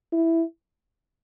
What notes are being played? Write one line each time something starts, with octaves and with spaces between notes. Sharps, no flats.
E4